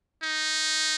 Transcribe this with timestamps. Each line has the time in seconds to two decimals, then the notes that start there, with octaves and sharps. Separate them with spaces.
0.23 D#4